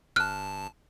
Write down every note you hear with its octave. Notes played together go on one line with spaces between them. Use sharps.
G1 A5 F6 F#6